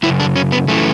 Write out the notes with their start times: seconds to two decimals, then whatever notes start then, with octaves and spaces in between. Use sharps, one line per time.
0.03 F#2 C#3 E4
0.20 D4
0.36 C#4
0.52 B3
0.68 F#2 C#3 E3 A3